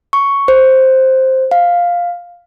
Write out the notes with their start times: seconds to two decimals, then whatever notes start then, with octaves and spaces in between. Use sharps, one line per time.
0.13 C#6
0.48 C5
1.51 F5